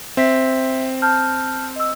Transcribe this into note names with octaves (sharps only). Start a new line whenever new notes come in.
C4 E5 B6
A5 F6 G6
D#5 E6